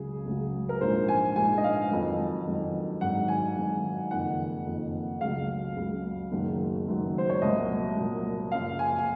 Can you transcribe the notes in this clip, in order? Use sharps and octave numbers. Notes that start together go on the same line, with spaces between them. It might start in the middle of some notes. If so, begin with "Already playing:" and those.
Already playing: C#2 C#3 F#3 G#4
C#2 C#3 F#3
A#4
A#1 G#2 F3 C5
G#5
A#1 G#2 F3 G#5
D#5
F5
F2 D#3 F#3
F2 D#3 F#3
G#1 G#2 F#3 F#5
G#5
G#1 G#2 F#3
F#1 F2 D#3 F#5
F#1 F2 D#3
C#2 C#3 F#3 F5
C#2 C#3 F#3
F#1 F#2 D#3 F#3
F#1 F#2 D#3 F#3
C5
C#5
C2 A#2 F#3 D#5
C2 A#2 F#3
F#1 F#2 F3 F5
G#5
G#5